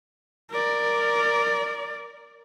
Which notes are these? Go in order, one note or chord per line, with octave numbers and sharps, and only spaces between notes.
A#4 D5